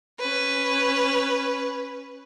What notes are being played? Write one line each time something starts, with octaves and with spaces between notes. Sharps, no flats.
C#4 B4